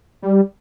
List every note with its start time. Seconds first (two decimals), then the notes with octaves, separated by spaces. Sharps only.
0.22 G3